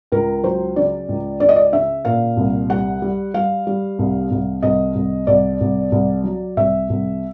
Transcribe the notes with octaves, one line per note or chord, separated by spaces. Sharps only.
C#2 A#4
F#3 C5
C#3 D5
C#2
C#3 D5
D#5
D5
C#3 E5
A#2 F5
C2
G3 F#5
G3
G3 F5
G3
C2
C2
C2 D#5
C2
C2 D5
C2
C2
F#3
C2 E5
C2